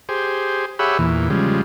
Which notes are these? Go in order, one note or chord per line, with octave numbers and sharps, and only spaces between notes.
G4 G#4 C5
G4 G#4 C#5 E5 F#5 B5
E2 A#2 E3
C#3 F3 G3 G#3